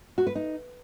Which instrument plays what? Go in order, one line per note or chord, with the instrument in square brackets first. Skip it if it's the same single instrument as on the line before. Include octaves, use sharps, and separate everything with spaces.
[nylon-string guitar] F#4
B4
D#4